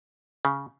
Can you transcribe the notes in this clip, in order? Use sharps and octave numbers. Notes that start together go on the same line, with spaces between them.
C#3